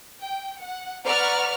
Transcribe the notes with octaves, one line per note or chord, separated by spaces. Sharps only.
G5
F#5
B4 D5 F#5 A#5 C#6 F6